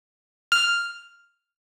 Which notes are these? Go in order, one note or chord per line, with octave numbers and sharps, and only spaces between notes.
F6